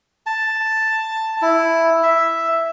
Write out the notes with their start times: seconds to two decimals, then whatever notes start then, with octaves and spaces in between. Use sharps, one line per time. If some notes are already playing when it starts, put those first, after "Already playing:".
0.26 A5
1.42 E4
2.03 E5